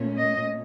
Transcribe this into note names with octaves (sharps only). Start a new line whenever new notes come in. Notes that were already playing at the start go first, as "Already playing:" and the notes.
Already playing: A#2 A3 C#4
D#5